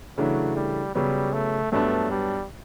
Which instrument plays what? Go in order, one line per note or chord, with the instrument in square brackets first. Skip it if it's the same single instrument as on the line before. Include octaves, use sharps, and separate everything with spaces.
[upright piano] C#3 E3 A3 D4 [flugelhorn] F#3
[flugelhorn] G3
[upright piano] C#3 F#3 B3 [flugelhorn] G3
[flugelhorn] A3
[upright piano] G2 F#3 B3 D4 [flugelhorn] A3
[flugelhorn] G3